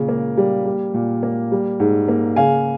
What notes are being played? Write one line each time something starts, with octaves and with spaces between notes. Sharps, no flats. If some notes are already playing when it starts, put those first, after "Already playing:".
Already playing: A#2 C#3
A#3
G3
G3
A#2
A#3
G3
G#2
A#3
C#3 F5 G#5